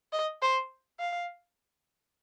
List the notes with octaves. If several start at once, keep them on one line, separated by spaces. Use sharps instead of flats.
D#5
C5
F5